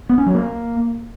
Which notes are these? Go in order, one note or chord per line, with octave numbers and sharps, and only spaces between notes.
B3
C#4
F#3
A#3